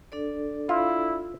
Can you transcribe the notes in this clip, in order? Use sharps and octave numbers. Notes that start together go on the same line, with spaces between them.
D4 A4 D5
E4 F4